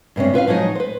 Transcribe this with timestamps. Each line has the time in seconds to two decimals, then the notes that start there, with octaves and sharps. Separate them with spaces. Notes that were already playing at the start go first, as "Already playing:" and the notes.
0.16 G2 C3 G#3 C#4
0.33 F4 B4 E5 F5
0.47 F3 F#3 G#3 D#4 G#4
0.75 B4 C5